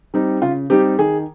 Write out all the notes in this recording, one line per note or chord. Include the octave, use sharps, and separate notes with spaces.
G3 C4 D#4
C#3 F4
G3 C4 D#4 G4
D#3 G#4